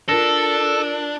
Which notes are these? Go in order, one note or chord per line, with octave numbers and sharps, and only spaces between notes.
D4 F4 A4 A#4 A#6